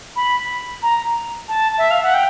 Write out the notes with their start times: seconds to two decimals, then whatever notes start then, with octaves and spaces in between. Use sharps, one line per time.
0.16 B5
0.83 A#5
1.48 A5
1.78 E5
1.91 F5
2.03 F#5
2.14 G5